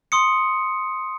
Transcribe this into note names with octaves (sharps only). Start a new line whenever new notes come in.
C6 D#6 C#7